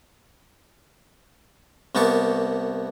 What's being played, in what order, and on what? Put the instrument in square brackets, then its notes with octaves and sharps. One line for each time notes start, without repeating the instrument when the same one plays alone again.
[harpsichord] C2 A#3 B3 G4 A5 C#6